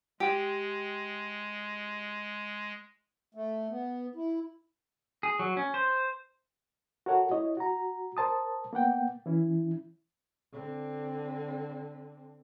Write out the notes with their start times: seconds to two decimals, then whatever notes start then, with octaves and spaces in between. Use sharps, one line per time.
0.20 G#3 G4
3.35 A3
3.70 B3
4.16 E4
5.23 G#4
5.39 F#3
5.57 C#4
5.74 C5
7.06 F#4 A4 A#4 C#5 F#5
7.32 E4 C#5 D#5
7.57 F#4 A#5
8.17 A#4 C5 A5 D#6
8.73 A#3 B3 F#5 G5
9.26 E3 C#4 E4
10.53 D3 C4